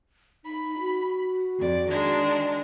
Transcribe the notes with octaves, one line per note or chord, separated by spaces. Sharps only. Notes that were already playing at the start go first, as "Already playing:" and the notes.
D#4 B5
F#4
F2 D5
D#3 G#3 D4